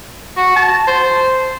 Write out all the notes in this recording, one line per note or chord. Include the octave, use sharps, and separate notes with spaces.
F#4
A5
C5